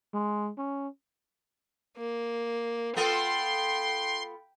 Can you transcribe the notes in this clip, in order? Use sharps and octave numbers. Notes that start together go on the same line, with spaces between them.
G#3
C#4
A#3
B3 F4 A4 G5 C6